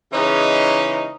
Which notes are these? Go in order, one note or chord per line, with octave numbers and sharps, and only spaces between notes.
C#3 E3 G#3 C#4 D#4